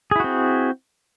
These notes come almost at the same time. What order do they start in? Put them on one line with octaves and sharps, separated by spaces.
G#4 E4 F#4 C4